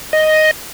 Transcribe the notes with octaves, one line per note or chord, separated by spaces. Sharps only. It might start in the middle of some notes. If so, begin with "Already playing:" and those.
D#5